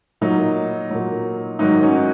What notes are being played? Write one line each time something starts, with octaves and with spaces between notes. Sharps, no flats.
A#2 F#3 D#4
A#2 F#3
G#2 D#3 F#3 D#4
C#4 F#4